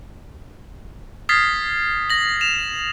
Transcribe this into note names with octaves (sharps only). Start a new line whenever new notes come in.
D#6 F6 G#6 A6 B6 C7
A#6 F#7
E7 F7